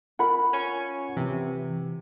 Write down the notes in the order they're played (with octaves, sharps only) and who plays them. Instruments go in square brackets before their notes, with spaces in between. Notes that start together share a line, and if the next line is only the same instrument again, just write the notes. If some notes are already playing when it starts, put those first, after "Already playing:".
[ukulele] F4 A#4 B5 [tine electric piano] F#5
[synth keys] C#4 G#5 C#6
[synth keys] C3 [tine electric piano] E3